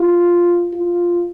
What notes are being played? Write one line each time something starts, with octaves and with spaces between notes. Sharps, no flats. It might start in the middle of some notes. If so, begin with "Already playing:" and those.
Already playing: F4
F4